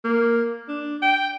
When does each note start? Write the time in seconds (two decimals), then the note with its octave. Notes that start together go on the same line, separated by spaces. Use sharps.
0.05 A#3
0.68 D4
1.02 G5